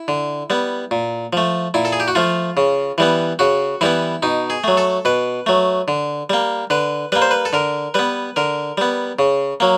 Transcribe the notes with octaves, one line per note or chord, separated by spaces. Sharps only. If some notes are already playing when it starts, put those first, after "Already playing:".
Already playing: E4
D3
G3 B3
A#2
F3 A3
A#2 E4
A4
G#4
G4
F#4
F3 A3 F4
C#3
E3 G3 B3
C#3 F#4
E3 G3 B3 E4
B2 D#4
G#4
F#3 A3
A4
B2 B4
F#3 A3
D3
G3 A#3
D3 B4
G3 A#3 B4
C5
B4
A4
D3 A#4
G3 B3 B4
D3 A#4
G3 B3
C#3
F#3 A#3